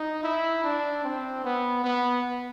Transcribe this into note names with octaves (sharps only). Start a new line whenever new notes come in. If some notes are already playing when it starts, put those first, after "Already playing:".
Already playing: D#4
E4
D4
C4
B3
B3